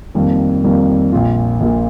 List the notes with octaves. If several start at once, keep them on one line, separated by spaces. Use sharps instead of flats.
F2 D#3 G3 A#3
F2 D#3 G3 A#3
A#1 A#2 A#3 F4
A#1 A#2 A#3 F4